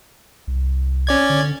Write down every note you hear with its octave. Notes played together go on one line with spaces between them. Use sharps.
C2
C#4 D5 G#6
D3